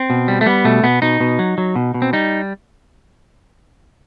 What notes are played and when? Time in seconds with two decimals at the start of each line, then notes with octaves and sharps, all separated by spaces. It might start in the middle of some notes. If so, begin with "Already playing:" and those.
Already playing: C4
0.10 B2
0.28 G3
0.41 A3
0.46 G3 B3
0.65 B2 A3
0.83 B2 B3
1.02 B2 D#4
1.20 B2
1.39 F#3
1.58 F#3
1.76 B2
1.94 B2
2.02 C4
2.13 G3 D#4